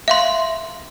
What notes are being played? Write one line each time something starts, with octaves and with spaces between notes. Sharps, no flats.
E5 F5 C6